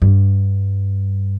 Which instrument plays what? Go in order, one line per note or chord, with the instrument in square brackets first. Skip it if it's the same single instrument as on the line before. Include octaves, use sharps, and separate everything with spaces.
[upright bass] G2